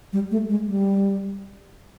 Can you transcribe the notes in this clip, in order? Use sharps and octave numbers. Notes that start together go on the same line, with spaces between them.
G3
A3
G#3
G3